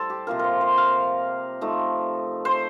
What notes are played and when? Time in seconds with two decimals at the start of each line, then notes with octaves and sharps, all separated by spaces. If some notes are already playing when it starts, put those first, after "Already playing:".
Already playing: A2 G3 A4 C5
0.10 G4
0.27 C3 F3 A#3 F4 A#4
0.39 A#4 C5
0.61 C5
0.78 F5
1.61 F3 A3 D#4
2.45 C5